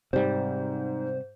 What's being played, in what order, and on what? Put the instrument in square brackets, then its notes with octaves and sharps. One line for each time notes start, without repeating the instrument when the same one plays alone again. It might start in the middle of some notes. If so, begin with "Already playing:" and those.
[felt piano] G#2 [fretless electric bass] C3 G3 [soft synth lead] C5